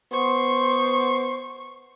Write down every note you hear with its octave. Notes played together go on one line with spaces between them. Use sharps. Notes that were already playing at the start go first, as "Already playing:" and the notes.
B3 C5 C6 C#6